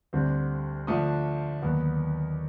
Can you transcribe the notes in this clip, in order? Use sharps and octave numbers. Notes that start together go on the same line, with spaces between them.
D2 D3 G3 C4
D3 F3 A3 D4 D#6
D#2 D3 F#3 B3